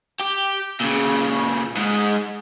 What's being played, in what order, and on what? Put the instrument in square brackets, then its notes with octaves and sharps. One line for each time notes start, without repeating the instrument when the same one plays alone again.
[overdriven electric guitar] G4
A#2 C#3
G#2 G#3